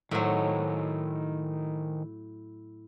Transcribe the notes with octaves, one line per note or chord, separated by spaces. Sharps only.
A2 D#3 F#3 C5